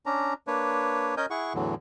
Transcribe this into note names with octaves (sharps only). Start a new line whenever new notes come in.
C#4 D4 A#5
A#3 D4 B4 C#5
C#4 A#4 D#5 G#5 G6
E4 G#4 F#5 C#6
E2 A2 D3 E3 F#3